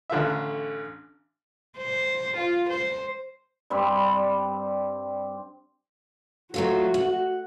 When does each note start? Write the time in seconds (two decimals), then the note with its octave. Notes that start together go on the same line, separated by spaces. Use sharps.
0.10 A1 D3 F4 E5
1.78 C5
2.36 F4
2.69 C5
3.70 G2 G3 C4 B5
6.54 F#3 A3 F4 F#4
6.94 F#5